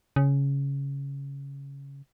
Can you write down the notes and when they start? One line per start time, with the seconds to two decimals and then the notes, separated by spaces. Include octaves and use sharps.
0.16 C#3